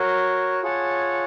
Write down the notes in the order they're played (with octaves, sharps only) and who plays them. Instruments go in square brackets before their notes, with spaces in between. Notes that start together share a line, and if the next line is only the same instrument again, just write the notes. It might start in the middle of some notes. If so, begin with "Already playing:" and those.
Already playing: [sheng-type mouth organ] F#4 A#4 C#5
F4 G#4 C#5 F#5 A5